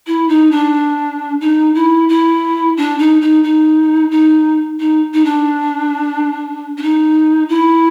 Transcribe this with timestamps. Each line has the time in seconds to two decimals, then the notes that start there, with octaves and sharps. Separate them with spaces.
0.07 E4
0.28 D#4
0.51 D4
1.41 D#4
1.75 E4
2.09 E4
2.77 D4
2.98 D#4
3.21 D#4
3.44 D#4
4.11 D#4
4.79 D#4
5.14 D#4
5.25 D4
6.77 D4
6.82 D#4
7.49 E4